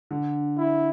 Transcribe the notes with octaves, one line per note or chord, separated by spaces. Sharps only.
D3
E4